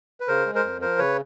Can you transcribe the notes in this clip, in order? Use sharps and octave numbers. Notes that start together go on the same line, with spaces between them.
B4
C#3 A#4 C5
G#3
A#4 C5
F2
F3 A#4 C5
C#3 B4 C#5